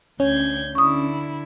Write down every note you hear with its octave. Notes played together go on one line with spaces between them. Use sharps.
D2 C#4 G6 G#6
D3 E4 C#6 D#6